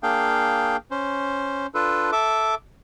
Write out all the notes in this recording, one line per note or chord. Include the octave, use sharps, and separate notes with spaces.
A#3 D4 G#4 F5 G5
C#4 C5
D4 F4 A4 B4
A4 E5 D6